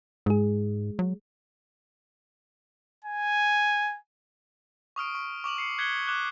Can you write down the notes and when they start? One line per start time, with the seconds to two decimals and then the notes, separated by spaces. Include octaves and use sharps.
0.26 G#2 G#3 G#4
0.99 F#3
3.04 G#5
4.96 C#6 D#6 F6 D7
5.15 C#6
5.44 C#6 D6 F7 F#7
5.57 D6 C7 C#7
5.78 F#6 G#6 B6 C#7 F#7 G7
6.07 D6 F#6 G7